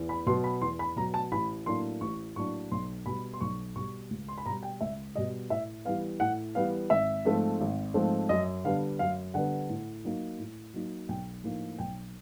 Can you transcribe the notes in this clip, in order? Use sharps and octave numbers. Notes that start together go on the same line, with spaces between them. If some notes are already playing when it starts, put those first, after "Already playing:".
Already playing: E2
B5
B2 F#3 C6
B5
E2 C6
B5
B2 F#3 A#5
A5
A1 B5
A2 F#3 A#3 D4 C6
A1 C#6
A2 F#3 A#3 D4 C#6
B1 C6
B2 G3 B5
C6
B1 C#6
B2 G3 C#6
C#2
C6
B5
B2 G3 A#5
G5
C#2 E5
B2 G3 D#5
A2 E5
E3 G3 B3 F5
A2 F#5
E3 G3 B3 F5
G#1 E5
G#2 F3 A3 C4
G#1
G#2 F3 A3 C4
F#2 D#5
D3 G3 B3 D4 F5
F#2 F5
D3 G3 B3 D4 F#5
A2
F#3 A#3 D#4
A2
F#3 A#3 D#4
B1 G5
A2 F3 A#3 D#4
B1 G5